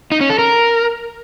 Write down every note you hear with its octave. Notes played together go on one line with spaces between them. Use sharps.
D#4
C#4
A4
A#4